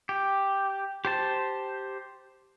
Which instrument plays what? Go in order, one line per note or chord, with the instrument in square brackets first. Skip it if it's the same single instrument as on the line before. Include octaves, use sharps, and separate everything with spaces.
[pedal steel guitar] G4
G4 C5 A5